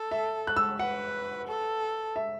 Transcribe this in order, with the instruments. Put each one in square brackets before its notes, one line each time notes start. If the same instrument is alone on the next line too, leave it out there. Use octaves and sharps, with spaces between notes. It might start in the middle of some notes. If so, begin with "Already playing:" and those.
Already playing: [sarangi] A4
[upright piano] E5
F#6
E6
[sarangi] B4 [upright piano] F#5
[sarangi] A4
[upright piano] E5